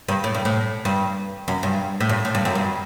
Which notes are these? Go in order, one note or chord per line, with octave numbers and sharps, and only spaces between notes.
G2
A2
G2
A2
G2
F#2
G2
A2
G2
A2
G2
F#2
G2